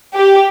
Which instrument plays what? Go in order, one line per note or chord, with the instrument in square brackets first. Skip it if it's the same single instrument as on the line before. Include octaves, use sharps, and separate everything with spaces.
[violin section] G4